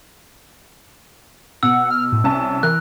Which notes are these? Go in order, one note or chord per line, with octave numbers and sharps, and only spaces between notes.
B2 F#5 E6
F6
A2
C2 C#4 A5
E3 A#4 F#6